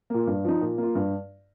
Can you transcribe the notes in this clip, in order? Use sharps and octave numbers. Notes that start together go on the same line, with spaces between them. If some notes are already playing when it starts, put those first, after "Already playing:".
A#2 A#3
G2
F3 D#4
A#2
A#3 F4
G2